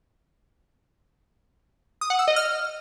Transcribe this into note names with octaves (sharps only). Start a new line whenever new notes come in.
D#6
F#5
E6
D#5
F6